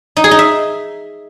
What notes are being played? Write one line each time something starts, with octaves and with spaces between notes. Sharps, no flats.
D#4
G#4
D#4
E5